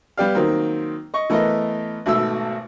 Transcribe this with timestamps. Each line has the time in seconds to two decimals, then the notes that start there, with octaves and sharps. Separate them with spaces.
0.17 G3 B3 G4 D5 F5
0.35 D#3 F#3 A#3 C4
1.14 D#5 C#6
1.30 E3 A3 B3 A#4 D#5
2.06 G#1 B2 A3 E5 E6